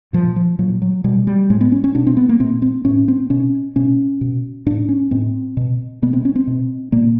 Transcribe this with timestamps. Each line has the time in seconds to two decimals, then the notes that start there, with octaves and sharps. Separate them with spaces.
0.13 A#2 F3
0.36 F3
0.59 A#2 F#3
0.82 F#3
1.04 B2 G3
1.27 G3
1.50 A2 G#3
1.61 B3
1.72 C#4
1.84 C#4
1.95 B2 D4
2.07 C4
2.17 B3
2.29 A#3
2.40 A#2 C4
2.62 C4
2.85 A2 C#4
3.08 C4
3.30 B2 C#4
3.76 B2 C#4
4.21 B2
4.66 A2 D4
4.89 C#4
5.11 A2 C4
5.57 B2
6.02 B2 B3
6.13 C4
6.25 C#4
6.36 C4
6.47 B2
6.92 A#2 A#3